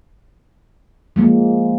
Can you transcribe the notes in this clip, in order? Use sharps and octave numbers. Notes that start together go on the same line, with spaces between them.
F3 G#3 A#3